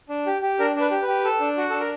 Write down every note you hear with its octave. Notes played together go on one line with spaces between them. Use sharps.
D4
G4
G4
D4 A#4
D4 B4
G4
B4
G4
A4
D4
F#4
D4 A4
A#4